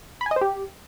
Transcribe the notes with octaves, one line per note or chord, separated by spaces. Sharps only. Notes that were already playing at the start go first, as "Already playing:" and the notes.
B5
G#5
D#5
C5
G4